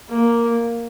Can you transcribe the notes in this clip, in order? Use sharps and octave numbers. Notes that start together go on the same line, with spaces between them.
A#3